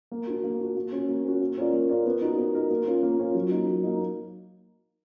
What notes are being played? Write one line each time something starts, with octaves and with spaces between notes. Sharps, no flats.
A#3
D4 F#4
A#3
D4 F#4
A#3
C#4 F#4
A#3
C#4 F#4
A#3
C#4 F4 A#4 D5
A#3
C#4 F4 A#4 D5
B3
D#4 F#4 A#4
B3
D#4 F#4 A#4
A#3
C#4 F4
A#3
C#4 F4
F#3
A#3 D#4
F#3
A#3 D#4